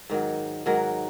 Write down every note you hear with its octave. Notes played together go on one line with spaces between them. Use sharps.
G#2 D#3 F#3
G#2 D#3 F#3 A#4